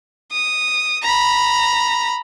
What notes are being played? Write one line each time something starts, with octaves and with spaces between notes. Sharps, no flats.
D#6
A#5 B5